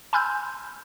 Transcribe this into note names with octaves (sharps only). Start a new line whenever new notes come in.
G#5 B5 C6 E6 F6 G6